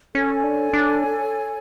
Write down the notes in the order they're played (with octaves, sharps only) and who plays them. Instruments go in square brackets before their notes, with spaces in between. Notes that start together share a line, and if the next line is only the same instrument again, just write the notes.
[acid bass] C#4 [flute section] A4 C#5 G#5
[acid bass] D4
D4